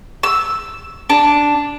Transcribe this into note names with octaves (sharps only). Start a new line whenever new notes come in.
E6
D4